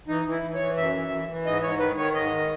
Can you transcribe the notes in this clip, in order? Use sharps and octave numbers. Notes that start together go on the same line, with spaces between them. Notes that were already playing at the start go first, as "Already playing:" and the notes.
E3 D#4
E3
E4
E3
C#5
E3
F#2 E5
E3
E3
E3
G#2 D#5
G#2 C#5
D#3 B4
D#3 C#5
G#2 D#5
D#3